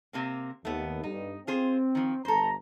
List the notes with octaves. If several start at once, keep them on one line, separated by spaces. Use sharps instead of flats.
C3 A#3 C4
D#2 A3 B3
G2 D#4
C4 F4 G#4 C5
D#3 F3
G1 A4 C5 A#5